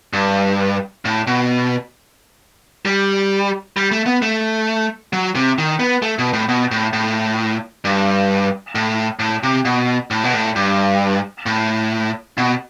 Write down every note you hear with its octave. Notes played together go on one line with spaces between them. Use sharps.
G2
A2
B2
G3
G3
A3
B3
A3
F#3
C3
D#3
B3
A3
B2
A2
B2
A2
A2
G2
A2
A2
C3
B2
A2
B2
A2
G2
A2
B2